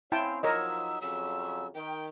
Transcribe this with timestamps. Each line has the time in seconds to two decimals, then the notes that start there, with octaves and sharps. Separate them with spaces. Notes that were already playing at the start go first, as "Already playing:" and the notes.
0.12 C4 C#4 E4 F5 G5 A5
0.43 F3 F#3 D#4 A#4 C#5 D#5 E6
1.01 F2 C#3 F#3 E6
1.75 D#3 G5